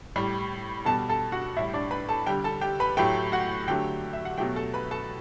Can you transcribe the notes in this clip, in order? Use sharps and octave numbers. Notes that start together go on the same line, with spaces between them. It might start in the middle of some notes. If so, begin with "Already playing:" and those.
A2 G3
B2 G3 A4 A5
A4 A5
F#4 F#5
A2 G3 E4 E5
D4 D5
B4 B5
A4 A5
D3 G3 G4 G5
A4 A5
G4 G5
B4 B5
A2 F#3 A3 G4 G5
F#4 F#5
D3 F#3 A3 G4 G5
E5
F#5
B2 F#3 A3 G4 G5
A4 A5
B4 B5
A4 A5